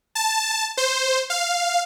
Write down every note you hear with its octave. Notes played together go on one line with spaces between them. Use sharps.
A5
C5
F5